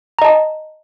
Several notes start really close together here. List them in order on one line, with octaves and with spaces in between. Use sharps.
A#5 D#5 A5